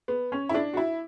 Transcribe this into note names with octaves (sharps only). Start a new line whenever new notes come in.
B3
C#4
E4
D4
F#4
E4